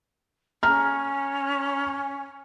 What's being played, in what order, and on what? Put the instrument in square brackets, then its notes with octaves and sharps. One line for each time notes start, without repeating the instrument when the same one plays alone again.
[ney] C#4 [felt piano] A#5 F6